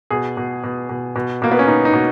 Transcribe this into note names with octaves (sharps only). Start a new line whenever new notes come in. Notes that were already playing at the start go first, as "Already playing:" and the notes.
B2 G#4
B2
B2
B2
B2
B2 A#3
B3
C#4
B2 D#4
D#4
B2